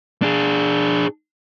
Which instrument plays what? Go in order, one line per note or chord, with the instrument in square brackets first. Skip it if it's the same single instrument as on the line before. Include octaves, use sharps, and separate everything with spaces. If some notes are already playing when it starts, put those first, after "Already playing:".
[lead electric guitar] D4 G#4